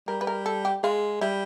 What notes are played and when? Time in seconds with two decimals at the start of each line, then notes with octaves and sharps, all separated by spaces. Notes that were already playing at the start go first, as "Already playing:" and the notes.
0.08 G3 A#4
0.21 B4
0.27 A#4
0.46 A4
0.65 G4
0.83 G#3 F4
1.21 G3 E4